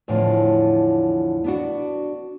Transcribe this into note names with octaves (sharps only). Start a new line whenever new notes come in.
E2 A2 D3 F3
B3 D4 F#4